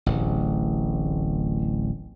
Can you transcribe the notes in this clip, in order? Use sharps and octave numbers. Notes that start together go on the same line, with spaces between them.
D1 A1